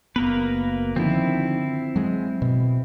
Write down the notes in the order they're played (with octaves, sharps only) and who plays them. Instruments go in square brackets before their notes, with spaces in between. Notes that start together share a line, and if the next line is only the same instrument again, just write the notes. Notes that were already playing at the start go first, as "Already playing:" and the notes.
[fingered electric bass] F#1 B3 [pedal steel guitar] A#3 A#4 B4
[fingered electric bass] D3 D#3 F3 [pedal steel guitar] C4 E4
[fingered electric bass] F#3 G#3
B2